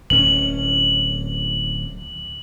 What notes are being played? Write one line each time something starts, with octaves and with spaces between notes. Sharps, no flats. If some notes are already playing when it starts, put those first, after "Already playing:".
D1 C#4 F#7